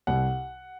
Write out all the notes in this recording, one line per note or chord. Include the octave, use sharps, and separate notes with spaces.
C2 F#5